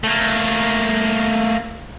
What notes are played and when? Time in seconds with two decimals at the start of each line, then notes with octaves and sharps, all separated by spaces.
0.04 A3 A#3